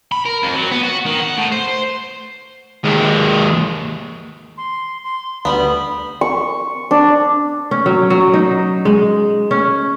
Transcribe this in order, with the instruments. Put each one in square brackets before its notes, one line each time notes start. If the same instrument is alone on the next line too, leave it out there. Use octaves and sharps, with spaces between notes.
[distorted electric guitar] B5
A#4
F2
F#3
B3
F#4
D#3
F#5
A2
C5
D#2 G#3
[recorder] C6
C6
[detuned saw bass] D2 [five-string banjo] G3 B3 [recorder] B5
[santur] C#6
D4
[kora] C#4
F#3
F#3
D#4
G#3
C#4